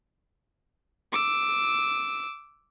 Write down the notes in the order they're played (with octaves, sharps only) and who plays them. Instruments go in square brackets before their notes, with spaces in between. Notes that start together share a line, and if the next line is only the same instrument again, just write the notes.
[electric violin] D6 E6